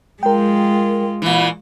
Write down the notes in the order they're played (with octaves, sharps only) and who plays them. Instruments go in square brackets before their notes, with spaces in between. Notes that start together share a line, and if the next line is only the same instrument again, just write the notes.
[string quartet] G#3 F4 [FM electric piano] A#4 G5
[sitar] A#2 E3